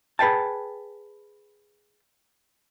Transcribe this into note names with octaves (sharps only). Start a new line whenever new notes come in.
G#4 B4 F5 G5 A5